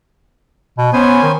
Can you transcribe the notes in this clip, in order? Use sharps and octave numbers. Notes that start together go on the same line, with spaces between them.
B2
B3 C#4 C5 G#5
D#3